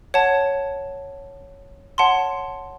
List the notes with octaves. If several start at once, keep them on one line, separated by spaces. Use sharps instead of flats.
C#5 F#5 A5
C#5 F#5 A5 C6